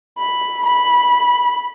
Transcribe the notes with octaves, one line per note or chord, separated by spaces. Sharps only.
B5
B5